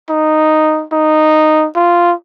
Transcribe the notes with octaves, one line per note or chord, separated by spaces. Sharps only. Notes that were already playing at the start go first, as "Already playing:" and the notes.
D#4
D#4
F4